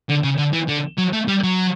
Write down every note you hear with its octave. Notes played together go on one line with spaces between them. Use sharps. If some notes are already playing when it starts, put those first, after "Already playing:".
D3
C#3
D3
E3
D3
F#3
A3
G3
F#3